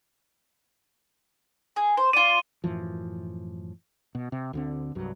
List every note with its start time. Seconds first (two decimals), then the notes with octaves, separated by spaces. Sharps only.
1.76 G#4
1.97 C5
2.13 F4 D5 D#7 G7
2.64 F#2 A2 E3 F3
4.15 B2
4.32 C3
4.53 D2 D3 C4
4.95 C2 G2 F#3